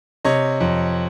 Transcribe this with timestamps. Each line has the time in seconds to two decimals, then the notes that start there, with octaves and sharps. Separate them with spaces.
0.25 C3 C#5 D#5
0.60 F2